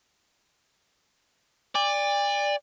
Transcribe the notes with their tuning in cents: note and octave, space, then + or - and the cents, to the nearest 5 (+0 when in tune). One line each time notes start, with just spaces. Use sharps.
D5 +0 G#5 -45